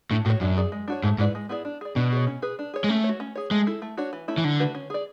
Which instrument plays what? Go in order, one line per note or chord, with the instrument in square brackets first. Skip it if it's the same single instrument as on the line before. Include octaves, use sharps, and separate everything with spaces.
[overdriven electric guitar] A2 [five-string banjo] D4
[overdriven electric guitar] A2 [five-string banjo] F#4 C#5
[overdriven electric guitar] F#2 [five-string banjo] D4
[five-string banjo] G#4 D5
G#3
D4 F#4 C#5
[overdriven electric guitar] G#2 [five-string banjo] A3
[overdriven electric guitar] G#2 [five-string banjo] E4 B4 D5
[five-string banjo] G#3
B3 E4 G#4 D5
D4
G#4 D5
[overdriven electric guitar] B2 [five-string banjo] D4
[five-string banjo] G#4 C#5
C#4
G#4 B4
D4
G#4 C#5
[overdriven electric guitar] G#3
[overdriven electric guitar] A3 [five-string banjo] C#4
[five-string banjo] F#4 C#5
C#4
G#4 C#5
[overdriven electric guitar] G#3 [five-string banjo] A3
[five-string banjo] E4 A4
A3
D4 F#4 C#5
E3
A3 C#4 E4
[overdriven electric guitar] E3
[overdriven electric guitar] D3 [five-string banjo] F#3
[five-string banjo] A3 D4 F#4 B4
C#4
G#4 D5